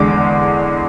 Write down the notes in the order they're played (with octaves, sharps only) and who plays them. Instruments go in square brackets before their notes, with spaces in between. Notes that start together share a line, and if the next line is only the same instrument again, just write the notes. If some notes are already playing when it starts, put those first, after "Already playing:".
Already playing: [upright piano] E2 D3 G#3 D6